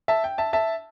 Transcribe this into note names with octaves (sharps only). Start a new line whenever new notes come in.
E5 A5
G5
E5 A5
E5 A5